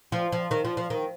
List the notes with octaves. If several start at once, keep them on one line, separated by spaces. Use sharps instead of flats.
F3
F3
D#3
F3
F3
D#3